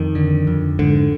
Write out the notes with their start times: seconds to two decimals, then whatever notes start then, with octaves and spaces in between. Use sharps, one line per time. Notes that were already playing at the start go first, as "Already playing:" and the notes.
Already playing: F2 D#3
0.15 D3
0.47 F2
0.79 G#2 D3